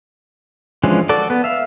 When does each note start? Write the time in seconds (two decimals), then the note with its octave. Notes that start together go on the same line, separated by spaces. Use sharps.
0.84 E3 F3 G#3 C#4 D4
1.09 F#4 A4 D5 D6
1.30 B3
1.44 E5 F5